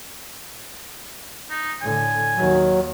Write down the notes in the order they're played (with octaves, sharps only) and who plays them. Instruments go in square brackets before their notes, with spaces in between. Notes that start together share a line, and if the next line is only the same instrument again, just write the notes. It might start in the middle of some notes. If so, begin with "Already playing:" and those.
[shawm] D#4
[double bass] A2 D3 [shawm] G#5
[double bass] D#2 D#3 [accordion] F#3